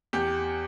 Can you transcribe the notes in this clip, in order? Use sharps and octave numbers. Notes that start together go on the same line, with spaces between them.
E2 G4